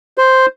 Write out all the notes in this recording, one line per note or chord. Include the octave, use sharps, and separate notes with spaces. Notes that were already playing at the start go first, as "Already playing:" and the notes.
C5